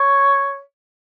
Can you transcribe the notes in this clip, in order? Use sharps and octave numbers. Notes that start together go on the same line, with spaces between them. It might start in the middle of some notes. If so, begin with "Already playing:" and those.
Already playing: C#5